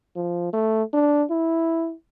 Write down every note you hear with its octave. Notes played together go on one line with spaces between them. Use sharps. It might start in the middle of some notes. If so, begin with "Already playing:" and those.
F3
A3
D4
E4